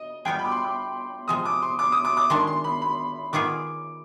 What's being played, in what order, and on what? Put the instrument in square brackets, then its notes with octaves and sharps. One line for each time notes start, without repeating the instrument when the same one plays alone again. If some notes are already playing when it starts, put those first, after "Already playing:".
Already playing: [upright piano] D#5
[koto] G3 B3 F4 G#4 [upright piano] G5
[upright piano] B5
D6
C6
D6
[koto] C3 F3 G#3 [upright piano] D#6
[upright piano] D6
C6
D6
D#6
D6
D6
[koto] D#3 G#3 D4 [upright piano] C6
[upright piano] C6
B5
B5
[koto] D#3 B3 F4 G#4 [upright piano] D6